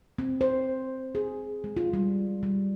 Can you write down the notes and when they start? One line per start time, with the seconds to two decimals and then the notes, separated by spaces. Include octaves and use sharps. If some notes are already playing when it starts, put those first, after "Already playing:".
0.19 C4
0.41 C5
1.15 G#4
1.64 G#3
1.77 F4
1.93 G3
2.43 G3